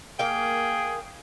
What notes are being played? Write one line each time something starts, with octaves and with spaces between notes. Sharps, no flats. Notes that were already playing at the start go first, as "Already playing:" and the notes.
A#3 G#4 F5 G5